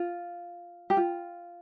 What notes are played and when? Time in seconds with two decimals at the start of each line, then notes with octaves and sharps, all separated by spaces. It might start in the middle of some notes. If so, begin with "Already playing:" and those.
Already playing: F4
0.90 G4
0.97 F4